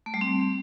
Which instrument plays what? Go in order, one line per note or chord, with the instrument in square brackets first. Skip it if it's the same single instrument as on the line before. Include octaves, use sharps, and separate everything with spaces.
[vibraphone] A3
G3
C4